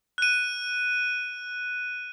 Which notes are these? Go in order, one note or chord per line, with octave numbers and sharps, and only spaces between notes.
F#6 D#7